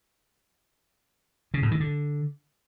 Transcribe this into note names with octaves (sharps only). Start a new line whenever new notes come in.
C#3
A2
D#3
D3